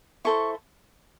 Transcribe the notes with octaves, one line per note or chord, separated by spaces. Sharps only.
E4 A4 C5 C#6